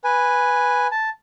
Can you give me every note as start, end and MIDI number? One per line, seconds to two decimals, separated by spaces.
0.04 0.87 71
0.04 0.87 80
0.92 1.10 81